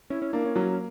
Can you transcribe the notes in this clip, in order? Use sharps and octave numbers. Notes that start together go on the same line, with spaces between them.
C#4 E4
C#4
A#3 D4
C#4
F#3 C#4